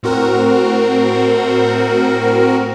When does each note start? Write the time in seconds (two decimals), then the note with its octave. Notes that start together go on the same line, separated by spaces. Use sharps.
0.03 A2 C4 F#4 A#4